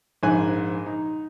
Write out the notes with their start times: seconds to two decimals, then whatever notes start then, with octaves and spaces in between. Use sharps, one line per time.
0.23 A#1 G#2 G#5 F#6
0.86 D#4